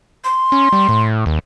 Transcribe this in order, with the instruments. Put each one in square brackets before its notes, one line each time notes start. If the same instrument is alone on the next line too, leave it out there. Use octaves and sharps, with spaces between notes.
[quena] C6
[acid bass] C#4
G3
A2
D#2